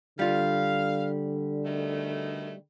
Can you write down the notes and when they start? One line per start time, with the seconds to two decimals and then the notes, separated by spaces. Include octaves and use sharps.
0.19 D3 G3 F4 F5
1.65 B2 D#3 A3